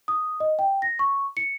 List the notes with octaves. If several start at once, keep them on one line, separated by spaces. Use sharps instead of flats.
D#6
D#5
G5
A#6
C#6
C#7